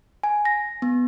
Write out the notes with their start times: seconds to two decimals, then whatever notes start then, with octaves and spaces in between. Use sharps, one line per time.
0.23 G#5
0.45 A#6
0.82 B3